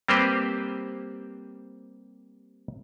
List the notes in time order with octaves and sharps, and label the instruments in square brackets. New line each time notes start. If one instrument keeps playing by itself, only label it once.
[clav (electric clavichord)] G3 A#3 C4 G4 B4 C5